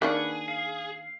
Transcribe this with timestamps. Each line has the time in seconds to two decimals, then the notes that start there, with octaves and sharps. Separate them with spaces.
0.02 D#3 A#3 D4 G#4 B4 F#5
0.48 F5